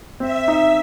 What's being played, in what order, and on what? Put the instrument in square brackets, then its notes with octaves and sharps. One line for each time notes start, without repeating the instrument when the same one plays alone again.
[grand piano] C4 [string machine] E5
[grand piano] D#4